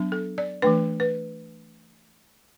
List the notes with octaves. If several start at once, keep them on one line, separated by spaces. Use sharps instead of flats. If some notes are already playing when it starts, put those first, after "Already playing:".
Already playing: F#3 B3 D4
A4
D5
E3 A3 D4 B4
B4